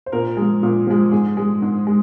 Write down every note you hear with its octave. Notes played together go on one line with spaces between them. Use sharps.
C5
A#2 A#4
F3 G#3
A#2
F3 G#3
G#2 G#4
G#3
G#2
G#3